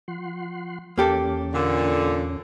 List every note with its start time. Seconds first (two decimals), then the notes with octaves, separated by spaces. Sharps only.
0.08 F3 F#5 C6
0.98 E2 A#3 C#4 G4 A4
1.54 A#2 D3